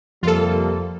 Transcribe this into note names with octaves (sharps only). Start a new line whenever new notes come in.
F2 C3 F3 G3 A#3 F4 A4